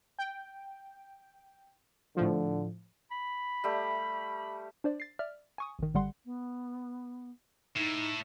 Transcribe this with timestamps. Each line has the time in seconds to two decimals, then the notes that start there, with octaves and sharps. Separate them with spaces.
0.19 G5
2.17 A2 D3 F3
3.11 B5
3.64 G3 A3 G4
4.84 D4 C5 D5
5.00 A6 C7
5.19 D5 E5 F6
5.58 G#5 C#6 D#6
5.79 A1 D#3
5.94 G#1 D3 G3 F#5 C6
6.25 B3
7.76 A2 D#4